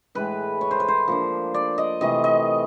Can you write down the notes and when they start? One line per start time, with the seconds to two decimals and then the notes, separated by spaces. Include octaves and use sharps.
0.15 A2 E3 G#3 B4
0.61 C#5
0.71 C5
0.80 B4
0.88 C5
1.08 F3 A#3 D4
1.54 D5
1.78 D#5
2.01 C3 E3 A3 D#5
2.24 D#5